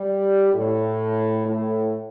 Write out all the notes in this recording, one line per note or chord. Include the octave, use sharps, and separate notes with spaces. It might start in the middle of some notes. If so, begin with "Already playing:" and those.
Already playing: G3
A2
A2